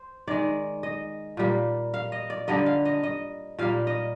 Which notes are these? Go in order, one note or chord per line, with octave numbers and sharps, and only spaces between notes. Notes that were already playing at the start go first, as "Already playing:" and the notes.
Already playing: C5
D#3 G#3 D5
D#5
A#2 G3 A#3
F5
D#5
D5
D3 G3 A#3 D#5
F5
D#5
D#5
A#2 G3 A#3 F5
D#5